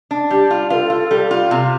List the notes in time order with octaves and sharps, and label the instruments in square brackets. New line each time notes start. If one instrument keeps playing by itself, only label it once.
[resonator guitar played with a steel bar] D4
[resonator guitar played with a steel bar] G3 [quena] G4
[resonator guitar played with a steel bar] F4
[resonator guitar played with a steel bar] F4 [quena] A4 B4
[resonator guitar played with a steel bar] F4
G3
F4
C3